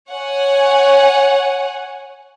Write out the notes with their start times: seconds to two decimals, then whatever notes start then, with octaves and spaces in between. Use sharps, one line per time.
0.11 C#5 F#5 G#5